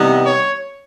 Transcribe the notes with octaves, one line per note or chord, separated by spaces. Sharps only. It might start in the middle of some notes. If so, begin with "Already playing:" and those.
Already playing: C3 E3 G3 B3 D#4
C#5